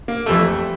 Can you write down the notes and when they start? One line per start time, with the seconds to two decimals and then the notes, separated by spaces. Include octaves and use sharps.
0.08 A#3
0.26 F2 E3 G3 A3